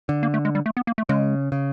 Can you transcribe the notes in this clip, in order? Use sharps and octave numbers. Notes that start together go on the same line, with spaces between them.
D3
A#3
A3
G#3
G3
A3
B3
A#3
A3
C#3 G#3
C#3